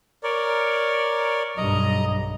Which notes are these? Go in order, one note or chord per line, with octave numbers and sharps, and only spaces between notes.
A#4 C#5 D5
B1 G2 D#5 A#5